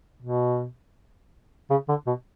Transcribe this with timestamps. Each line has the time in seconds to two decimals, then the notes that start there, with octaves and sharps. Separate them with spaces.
0.22 B2
1.70 C#3
1.89 D3
2.07 B2